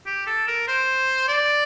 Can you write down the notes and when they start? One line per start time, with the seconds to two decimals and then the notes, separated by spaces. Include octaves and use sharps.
0.06 G4
0.26 A4
0.47 A#4
0.68 C5
1.28 D5